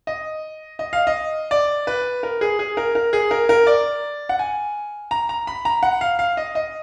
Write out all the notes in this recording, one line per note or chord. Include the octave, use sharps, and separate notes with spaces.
D#5
D#5
F5
D#5
D5
B4
A#4
G#4
G#4
A#4
A#4
G#4
A#4
A#4
D5
F#5
G#5
A#5
A#5
B5
A#5
F#5
F5
F5
D#5
D#5